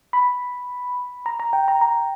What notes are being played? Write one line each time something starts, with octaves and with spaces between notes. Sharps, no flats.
B5
A#5
A#5
G5
A#5
A#5